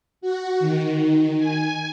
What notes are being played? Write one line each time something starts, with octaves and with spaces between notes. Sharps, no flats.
F#4
D#3
G#5